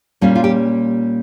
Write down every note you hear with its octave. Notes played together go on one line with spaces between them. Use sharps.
A#2 G3 A#3 C#4 F4
F4
G4